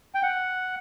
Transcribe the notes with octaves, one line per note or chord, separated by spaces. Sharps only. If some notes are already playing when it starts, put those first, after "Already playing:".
G5
F#5